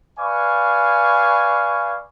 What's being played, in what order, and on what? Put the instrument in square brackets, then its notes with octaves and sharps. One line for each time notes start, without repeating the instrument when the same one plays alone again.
[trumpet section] B4 D5 F5 G#5 C#6